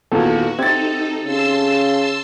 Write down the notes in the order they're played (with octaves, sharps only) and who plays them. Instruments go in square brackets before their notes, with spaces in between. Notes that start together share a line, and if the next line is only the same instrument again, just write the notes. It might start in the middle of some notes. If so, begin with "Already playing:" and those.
[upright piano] E2 A#2 D#3 [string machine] F#4 [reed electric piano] A4
[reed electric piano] C4 G4 [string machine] D#4 A4 [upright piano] G#6 A6
[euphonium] C#3 [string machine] A5 C6 E6